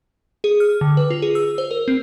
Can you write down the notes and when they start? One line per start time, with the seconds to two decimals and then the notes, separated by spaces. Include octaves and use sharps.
0.44 G#4
0.60 F6
0.81 D3
0.97 B4
1.10 F4
1.22 G#4
1.35 E6
1.58 C5
1.71 A#4
1.88 C4